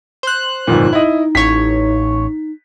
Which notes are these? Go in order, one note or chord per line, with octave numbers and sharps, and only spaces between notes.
C5 F#6
G1 F2 A#2 D#4
E4 D#5
A1 C#5 B6